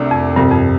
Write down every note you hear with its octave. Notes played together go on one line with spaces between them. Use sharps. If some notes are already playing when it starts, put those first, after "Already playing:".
Already playing: C2 C3 A3 D4
F2
C2 G2 C3 F3
F2